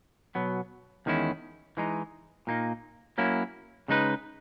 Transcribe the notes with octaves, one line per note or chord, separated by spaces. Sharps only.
B2 F#3 B3
E2 D#3 G#3 C#4 E4
E3 G#3 D#4
A#2 A#3 D#4
F#3 A#3 C#4 E4
C#3 G#3 D#4 G#4 B4